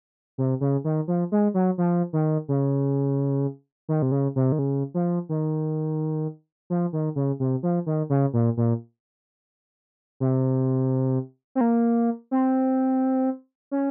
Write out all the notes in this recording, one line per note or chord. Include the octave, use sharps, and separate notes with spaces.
C3
C#3
D#3
F3
G#3
F#3
F3
D#3
C#3
D#3
C3
C#3
C3
D#3
C#3
F3
D#3
F3
D#3
C#3
C3
F3
D#3
C#3
A#2
A#2
C3
C4
A#3
C4
C#4